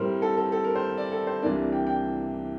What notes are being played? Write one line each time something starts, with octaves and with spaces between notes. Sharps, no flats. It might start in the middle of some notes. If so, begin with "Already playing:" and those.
Already playing: A2 G3 C4 A#4 C5
A4
A4
A4
A#4
C5
D5
A4
C5
C2 C3 E3 A#3 D4 D5
G5
G5